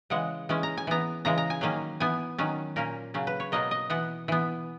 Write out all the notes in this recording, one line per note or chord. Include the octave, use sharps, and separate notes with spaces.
C#3 E3 G#3 F#5
E3 G#3 C#4
A#5
G#5
E3 B3 A#5
C#3 E3 G#3 A#5
A#5
G#5
D#3 F#3 A#3 C#4
E3 B3 G#5
D#3 F#3 C#4
A#2 A#3 C#4 A#4
C#3 F#3 C#4
B4
C#5
B2 F#3 A#3 D#5
D#5
E3 B3 F#5
E3 B3